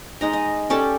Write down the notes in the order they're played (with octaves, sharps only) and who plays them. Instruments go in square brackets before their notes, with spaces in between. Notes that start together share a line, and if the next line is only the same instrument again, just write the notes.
[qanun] G#3 D#4 A#5
D#5
C#4 G4 A4 D5